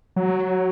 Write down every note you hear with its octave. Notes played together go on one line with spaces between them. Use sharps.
F#3